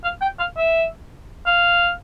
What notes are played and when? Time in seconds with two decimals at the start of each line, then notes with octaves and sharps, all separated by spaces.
0.04 F5
0.22 G5
0.39 F5
0.57 E5
1.46 F5